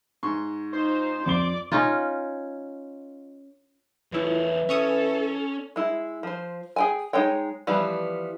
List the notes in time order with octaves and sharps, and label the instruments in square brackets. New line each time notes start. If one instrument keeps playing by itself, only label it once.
[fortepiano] G#2 C6 C#6
[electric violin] D#4 F4 [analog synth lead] C5
[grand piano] F2 C6 G7 [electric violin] D5 D6
[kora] C#4 D#4 F4
[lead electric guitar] E2 C#5 [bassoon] E3 [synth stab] A3 E4 F4
[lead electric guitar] C#4 [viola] A4 [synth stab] E5 C#6 D#6
[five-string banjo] G#3 E4
F3 C5
G#4 G5 G#5
G#3 D#4 C#5 G5
E3 F3 G3 B3